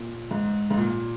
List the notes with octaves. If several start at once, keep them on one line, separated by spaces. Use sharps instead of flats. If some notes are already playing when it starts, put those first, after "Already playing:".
Already playing: A#2
G#2
G#2
A#2